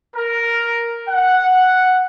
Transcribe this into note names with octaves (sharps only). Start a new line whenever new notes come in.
A#4
F#5